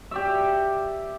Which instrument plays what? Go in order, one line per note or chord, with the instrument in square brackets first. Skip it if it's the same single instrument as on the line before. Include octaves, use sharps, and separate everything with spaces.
[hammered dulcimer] G4 D5 E5